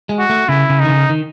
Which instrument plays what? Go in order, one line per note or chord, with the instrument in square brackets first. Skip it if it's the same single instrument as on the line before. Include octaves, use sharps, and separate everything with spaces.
[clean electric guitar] G#3
[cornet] F#4
[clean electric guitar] A3
[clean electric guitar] C#3 [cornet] E4
[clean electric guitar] C#3
[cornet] D#4
[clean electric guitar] D#3
C#3
D#3